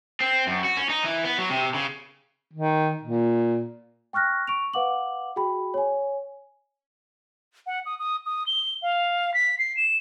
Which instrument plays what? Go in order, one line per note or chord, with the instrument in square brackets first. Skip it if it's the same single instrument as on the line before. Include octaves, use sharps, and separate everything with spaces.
[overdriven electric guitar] C4
F#2
F#4
C#4
D#4
E3
B3
F#3
C3
C#3
[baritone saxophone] D#3
A#2
[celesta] G5 C#6 F6 F#6 A#6
C#6 D7 F7
B4 F5 F#5 D6 F#7
F#4 G#4 G5 B5
C#5 G#5
[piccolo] F#5
D#6
D#6
D#6
G7
F5
B6
C7
E7